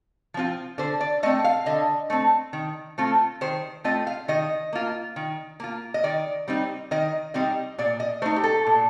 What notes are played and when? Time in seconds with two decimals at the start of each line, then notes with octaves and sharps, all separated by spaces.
0.34 F3 C4 F4
0.78 D3 C5
1.00 D5
1.23 A3 D#5
1.26 C4
1.44 F5
1.66 D3 D#5
2.10 A3 C4
2.53 D#3
2.98 A3 C4 F4
3.41 D#3 C5
3.84 A3 C4 F4 D#5
4.07 F5
4.28 D#3 D#5
4.73 A#3 F4
5.16 D#3
5.60 A#3 F4
5.94 D#5
6.04 D#3 D5
6.48 G3 C4 D#4
6.91 D#3 D#5
7.34 G3 C4 D#4 D#5
7.78 A#2 D5
8.00 D#5
8.22 A3 C5
8.25 D#4
8.36 G4
8.44 A4
8.67 A#2